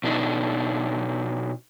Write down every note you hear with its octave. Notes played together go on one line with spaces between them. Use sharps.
B2 D4 D#4